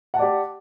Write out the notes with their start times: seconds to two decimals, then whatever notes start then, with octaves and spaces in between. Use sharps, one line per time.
0.14 F#5
0.17 A5
0.19 D5
0.22 G4